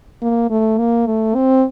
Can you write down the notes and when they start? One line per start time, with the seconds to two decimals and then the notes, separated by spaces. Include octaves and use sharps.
0.22 A#3
0.50 A3
0.78 A#3
1.06 A3
1.35 C4